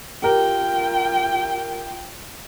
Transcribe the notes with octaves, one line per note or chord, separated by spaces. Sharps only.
F4 G4 A#4 G5